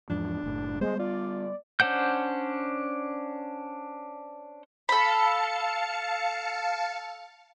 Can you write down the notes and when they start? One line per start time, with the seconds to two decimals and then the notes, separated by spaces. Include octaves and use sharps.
0.10 E2 G#2 F3 D4
0.44 F#1 A2
0.81 G3 G#3 A#3 B3 C5
0.99 F4 D5
1.80 C#4 D4 C5 F#5 G6
4.89 A4 F5 A5 B5 C#7